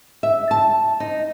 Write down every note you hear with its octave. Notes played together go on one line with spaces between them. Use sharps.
E5
A5
D#4